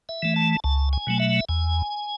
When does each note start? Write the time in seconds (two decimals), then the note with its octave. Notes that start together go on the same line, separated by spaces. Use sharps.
0.09 E5
0.23 E3 A3
0.36 A5
0.64 C#2 A5
0.93 G#5
1.07 B2 F#3 A3
1.20 E5
1.49 E2 G#5